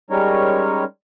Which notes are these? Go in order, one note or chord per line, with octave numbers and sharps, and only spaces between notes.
G3 G#3 C#4 D#4 A#4 C#5